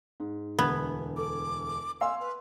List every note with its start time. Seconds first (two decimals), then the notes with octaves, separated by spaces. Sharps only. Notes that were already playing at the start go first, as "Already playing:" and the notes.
0.20 G#2
0.59 E1 D2 B3 G#6
1.17 A4 D6
2.01 F5 G#5 C6 E6
2.20 B4